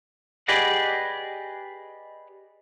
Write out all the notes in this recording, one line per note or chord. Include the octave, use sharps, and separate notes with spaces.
G4 G#4 B4 D5 D#5 F#5